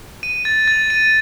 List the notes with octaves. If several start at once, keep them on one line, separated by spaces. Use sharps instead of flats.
D#7
A6
A6
D#7